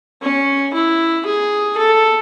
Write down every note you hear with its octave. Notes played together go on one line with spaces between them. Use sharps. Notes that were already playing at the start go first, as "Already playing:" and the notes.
C#4
E4
G#4
A4